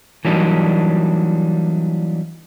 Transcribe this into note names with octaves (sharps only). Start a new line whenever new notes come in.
E3 F#3 G3 A#3 D4 D#4